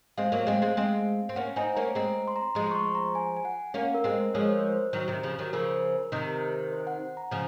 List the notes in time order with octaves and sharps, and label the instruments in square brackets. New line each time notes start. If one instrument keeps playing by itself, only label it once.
[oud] G#3 C4 [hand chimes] F5
[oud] F#3 A#3
G#3 C4
G#3 C4
G#3 C4
C4
[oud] A#3 C#4 [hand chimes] F#5
[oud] C4 D#4 [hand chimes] G#5
[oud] A#3 C#4 [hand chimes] A#5
[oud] G#3 C4 [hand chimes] A#5
[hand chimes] C6
A#5
[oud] F3 G#3 [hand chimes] C6
[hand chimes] C#6
C6
A#5
G#5
G#5
F#5
[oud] A#3 C#4 [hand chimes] F5
[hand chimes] A#4
[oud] G#3 C4
[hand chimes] A#4
[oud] F3 G#3 [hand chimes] C#5
[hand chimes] C5
A#4
C5
[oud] D#3 F#3
C3 D#3
C#3 F3
D#3 F#3
[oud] C#3 F3 [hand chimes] A#4
[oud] C3 D#3
[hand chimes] C5
F#5
A#5
[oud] C#3 F3